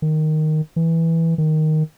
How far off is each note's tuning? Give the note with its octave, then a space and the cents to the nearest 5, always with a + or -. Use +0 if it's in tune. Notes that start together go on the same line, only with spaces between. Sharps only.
D#3 -5
E3 -5
D#3 +0